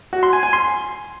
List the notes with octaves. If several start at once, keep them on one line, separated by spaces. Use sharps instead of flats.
F#4
C6
G#5
G#5
C6